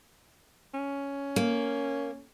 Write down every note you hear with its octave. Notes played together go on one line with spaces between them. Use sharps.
C#4
A#3